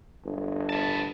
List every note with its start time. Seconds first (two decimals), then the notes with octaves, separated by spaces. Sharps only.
0.24 G1
0.70 B3 A5